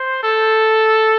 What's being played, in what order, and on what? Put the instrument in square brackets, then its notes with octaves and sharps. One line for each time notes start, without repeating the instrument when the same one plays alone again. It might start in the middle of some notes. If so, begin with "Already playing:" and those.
Already playing: [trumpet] C5
A4